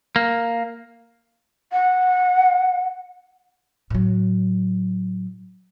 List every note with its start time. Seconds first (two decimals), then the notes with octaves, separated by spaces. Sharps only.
0.16 A#3
1.72 F#5
3.90 A2 F#3